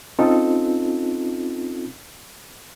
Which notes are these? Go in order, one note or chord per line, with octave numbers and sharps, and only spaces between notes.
C4 C#4 D#4 F4 A4